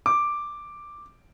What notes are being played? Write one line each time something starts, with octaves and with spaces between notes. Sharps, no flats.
D6